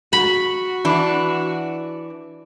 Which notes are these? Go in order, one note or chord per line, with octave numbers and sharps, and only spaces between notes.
F#4 B5
E3 D4